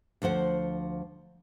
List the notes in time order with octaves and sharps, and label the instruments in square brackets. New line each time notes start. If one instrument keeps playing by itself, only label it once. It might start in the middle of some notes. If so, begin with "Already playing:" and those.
[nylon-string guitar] D2 F3 C5 F#5